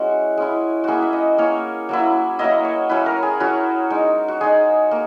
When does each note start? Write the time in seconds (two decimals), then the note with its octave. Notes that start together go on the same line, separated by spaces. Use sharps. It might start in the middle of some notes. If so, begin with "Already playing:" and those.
Already playing: G#3 C#4 E4 F#4
0.37 G#3 C#4 E4
0.84 A#3 C#4 E4 F#4 G#4
1.02 E5
1.13 D#5
1.38 A#3 C#4 E4 C#5
1.89 F#3 A#3 E4
2.39 F#3 A#3 E4 D#5
2.65 C#5
2.89 F#3 C#4 E4 B4
3.06 A#4
3.23 G#4
3.40 F#3 C#4 E4 F#4
3.90 G#3 D#4
4.28 F#4
4.41 G#3 D#4 G#4
4.91 A#3